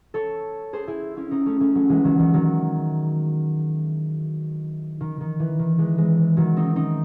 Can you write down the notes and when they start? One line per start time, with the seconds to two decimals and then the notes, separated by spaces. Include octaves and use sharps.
0.14 A4 C#5
0.73 G#4 C5
0.87 E4 G#4
1.17 C#4 E4
1.31 C4 D#4
1.46 A3 C#4
1.61 A3 C#4
1.75 F#3 A3
1.89 E3 G#3
2.04 D#3 F#3
2.19 D#3
2.33 D#3 F#3
5.01 D#3
5.20 D#3
5.40 E3
5.59 D#3
5.78 E3 G#3
5.98 G#3 C4
6.18 E3
6.37 D#3 F#3
6.56 C4 D#4
6.75 C4 D#4